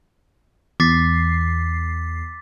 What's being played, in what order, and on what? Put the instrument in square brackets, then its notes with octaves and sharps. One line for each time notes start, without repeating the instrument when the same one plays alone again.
[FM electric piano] E2 C7 [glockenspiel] D6 A6 B6